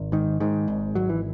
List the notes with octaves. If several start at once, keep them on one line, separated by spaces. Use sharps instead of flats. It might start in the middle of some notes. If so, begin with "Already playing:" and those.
Already playing: G#1
G#2 D#3
G#2 D#3
G#1
G#1 F#3
E3